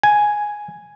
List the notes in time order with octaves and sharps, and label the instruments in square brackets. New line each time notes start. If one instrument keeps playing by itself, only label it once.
[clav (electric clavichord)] G#5